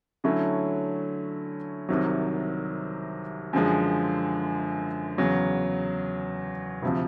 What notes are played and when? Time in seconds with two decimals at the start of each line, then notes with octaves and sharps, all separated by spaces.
0.24 D3 F#3 A3 C#4 E4
1.89 C2 C3 D#3 F#3
3.53 F#2 D3 F3 G#3
5.18 E2 C#3 F#3
6.83 D2 C3 F3